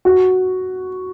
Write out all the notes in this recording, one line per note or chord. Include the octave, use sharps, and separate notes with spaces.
F#4